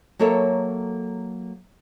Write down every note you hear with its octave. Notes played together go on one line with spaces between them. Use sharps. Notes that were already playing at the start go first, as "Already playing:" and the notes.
F#3 A#3 A4 C#5 E5